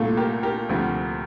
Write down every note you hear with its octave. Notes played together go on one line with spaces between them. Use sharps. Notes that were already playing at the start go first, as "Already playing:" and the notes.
Already playing: C2 A#2 A3 F4 A4
G4 A#4
G4 A#4
D2 C3 F3 A3